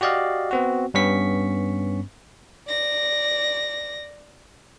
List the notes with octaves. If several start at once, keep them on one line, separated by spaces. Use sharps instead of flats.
F#4 G4 D5 D#5 F5
B3 C4 F#4
G2 B3 C#4 C#6 B6
D5 A#6